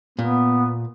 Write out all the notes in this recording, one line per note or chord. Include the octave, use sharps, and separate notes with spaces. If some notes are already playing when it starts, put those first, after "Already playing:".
A#2 B3